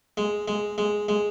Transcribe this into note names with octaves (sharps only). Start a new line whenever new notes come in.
G#3
G#3
G#3
G#3